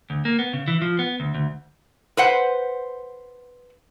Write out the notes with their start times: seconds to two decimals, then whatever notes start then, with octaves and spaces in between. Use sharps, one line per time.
0.10 D2
0.25 A#3
0.39 B3
0.53 C#3
0.68 E3
0.82 F3
0.99 B3
1.20 D2
1.34 D2
2.17 B4 C5 F#5